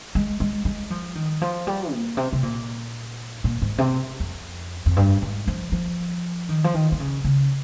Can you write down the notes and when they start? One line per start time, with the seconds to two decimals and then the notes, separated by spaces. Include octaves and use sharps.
0.15 G#3
0.40 G#3
0.65 G#3
0.90 F3
1.15 D#3
1.42 F3
1.67 G3
1.92 A#2
2.17 C3
2.33 C3
2.43 A#2
3.44 A#2
3.62 G#2
3.78 C3
4.20 F2
4.86 F2
4.97 G2
5.22 G#2
5.48 F3
5.72 F3
6.49 D#3
6.64 F3
6.74 D#3
6.92 D#3
7.00 C#3
7.24 C#3